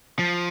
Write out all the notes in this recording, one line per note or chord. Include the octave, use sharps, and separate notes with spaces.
F3